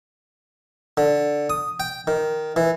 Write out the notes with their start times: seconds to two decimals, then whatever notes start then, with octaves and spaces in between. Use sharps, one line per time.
0.97 D3
1.50 D#6
1.80 G5
2.07 D#3
2.56 E3